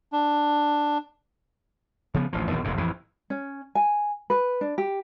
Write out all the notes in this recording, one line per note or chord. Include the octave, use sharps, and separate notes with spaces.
D4
C#3 F3 B3
A1 D2 F3
A#1 D#2 B2 E3
F1 A#1 G#2
A1 F2 E3
C#4
G#5
B4
D4
G4